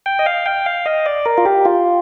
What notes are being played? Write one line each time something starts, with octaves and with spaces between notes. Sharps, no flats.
G5
D#5
F5
G5
F5
D#5
D5
A#4
F4
G4
F4